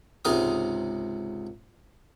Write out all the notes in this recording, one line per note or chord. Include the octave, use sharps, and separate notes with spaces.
C#2 G#2 C3 A#4 A#5 D#6